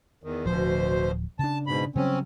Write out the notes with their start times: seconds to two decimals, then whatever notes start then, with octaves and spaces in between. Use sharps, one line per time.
0.24 E2 D#3
0.46 D1 D2 B2 F3 C5
1.39 C#3 D4 A5
1.67 G#2 B2 B5
1.96 C#3 F#3 G3 C4 C#4